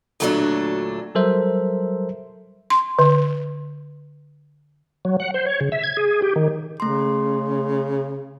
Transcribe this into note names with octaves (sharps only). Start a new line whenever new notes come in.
D2 A#2 F#3 A3 C4 D4
F#3 G3 A4 A#4 C5 E5
C6
D3
F#3
F#5
C5
C#5
C#3
E5
G#6
G#4
G4
D#3
C#3 A3 C6